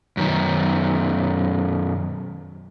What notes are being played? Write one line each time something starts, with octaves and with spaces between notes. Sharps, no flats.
F#2 D#3